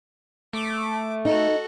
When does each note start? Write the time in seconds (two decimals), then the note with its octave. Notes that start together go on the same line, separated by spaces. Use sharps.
0.53 A3 D6
1.25 D#4 F#4 A4